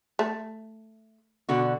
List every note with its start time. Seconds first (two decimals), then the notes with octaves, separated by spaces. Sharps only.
0.19 A3
1.49 B2 D3 F#4